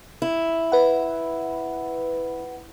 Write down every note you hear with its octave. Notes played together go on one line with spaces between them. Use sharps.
E4
B4 F#5